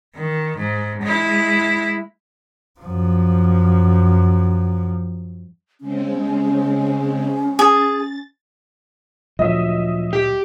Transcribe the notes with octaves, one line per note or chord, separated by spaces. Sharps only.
D#3
G#2
G#3 E4
F#2 F3
C#3 G#3 C4 C#4
G#4 A6
D2 A#2 F3 F#3 D#5 E5
G4